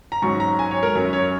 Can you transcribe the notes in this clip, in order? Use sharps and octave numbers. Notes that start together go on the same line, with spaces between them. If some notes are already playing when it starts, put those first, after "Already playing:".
A#5
G#2 F#3 C#4 C#6
A#5
G#5
C#5
A#4
F#2 F#3 C#4 C#5
C#5